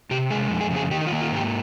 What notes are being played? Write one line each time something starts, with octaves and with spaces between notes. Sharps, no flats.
C3 G4
G#3 G#4
F2
G#4
C#3
G#4
D#3 G4
D#4
F4
A#3
F4
G#2 G4